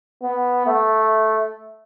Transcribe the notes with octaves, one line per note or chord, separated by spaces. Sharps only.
B3
A3